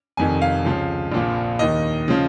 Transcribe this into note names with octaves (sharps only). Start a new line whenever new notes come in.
F1 F2 D#3 G#5
F5
C#2 C#3 F3
A#1 A#2 F3
D#2 D#3 D#5
C#3 F3